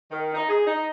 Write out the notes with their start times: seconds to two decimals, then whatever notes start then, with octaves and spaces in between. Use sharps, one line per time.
0.11 D#3
0.34 D#4
0.49 G#4
0.67 D#4